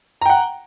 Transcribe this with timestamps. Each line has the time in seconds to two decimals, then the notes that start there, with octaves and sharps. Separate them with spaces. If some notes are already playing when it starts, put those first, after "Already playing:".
0.22 A#5
0.26 G5
0.30 F#5